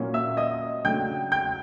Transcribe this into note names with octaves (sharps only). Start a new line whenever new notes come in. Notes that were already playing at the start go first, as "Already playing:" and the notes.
Already playing: A#2 F#3 A#3 C#4
E5 E6
D#5 D#6
C#3 F#3 A3 D4 G5 G6
G5 G6